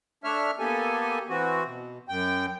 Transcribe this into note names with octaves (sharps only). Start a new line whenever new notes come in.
A3 D4 C#5 E5 F6
A#3 B3 G4 A4 G#5
E3 C4 F#4
B2
F#2 G5